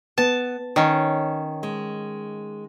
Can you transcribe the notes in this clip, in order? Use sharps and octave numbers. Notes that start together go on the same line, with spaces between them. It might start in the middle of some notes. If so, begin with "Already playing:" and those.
B3 A5
D#3 C#4 C#5
G#3